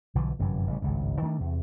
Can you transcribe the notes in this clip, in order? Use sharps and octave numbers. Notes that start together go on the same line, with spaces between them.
B1 D3 E3 F3
G1 F#2 C3 E3
A1 C#3 G3
G#1 C#2 G2
D#3 A3 B3 D4
E2 C3